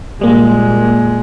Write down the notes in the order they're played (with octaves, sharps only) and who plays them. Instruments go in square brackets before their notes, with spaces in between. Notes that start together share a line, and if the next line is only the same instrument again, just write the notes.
[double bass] A#2 G#3 [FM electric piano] G3 A#3